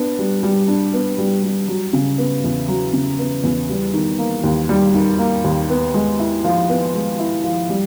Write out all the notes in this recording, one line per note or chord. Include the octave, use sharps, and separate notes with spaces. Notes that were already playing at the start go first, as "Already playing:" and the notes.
Already playing: B3 D4
G3
G3
D4
B3
G3
G3
F#3
C#3
B3
E2
F#3
C#3
B3
E2
G3
D#3
A#3
D#2
G3
D#3
A#3
D#2
B3
G#3
E4
F3
B3
G#3
E4
F3
G3